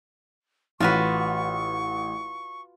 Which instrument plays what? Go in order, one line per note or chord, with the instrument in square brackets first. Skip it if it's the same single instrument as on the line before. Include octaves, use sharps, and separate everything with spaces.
[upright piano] A1 [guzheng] F4 F#4 B4 [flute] C#6